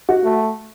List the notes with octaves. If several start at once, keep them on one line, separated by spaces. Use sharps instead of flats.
F#4
A3